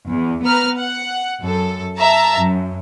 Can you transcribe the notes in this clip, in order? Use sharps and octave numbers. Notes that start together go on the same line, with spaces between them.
E2
B3 B4 A#5 F6
F#5
F#2 A4
E5 A5 A#5
F#2